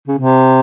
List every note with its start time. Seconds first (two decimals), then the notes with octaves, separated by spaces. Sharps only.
0.08 C#3
0.19 C3